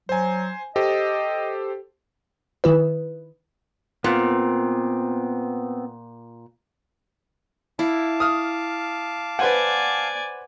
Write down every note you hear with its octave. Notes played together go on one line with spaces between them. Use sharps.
F#3 C5 G#5
G4 A4 C5 D#5
D#3 E4 B4
A#2 B3 C4
E4 F5 A5 D6
D#6 F6
B4 C5 D5 F#5 G#5